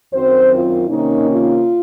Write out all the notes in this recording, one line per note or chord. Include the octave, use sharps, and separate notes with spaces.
F#2 D#3 F#3 C4 C5
F4
C3 D#3 A#3 C#4 D#4
F4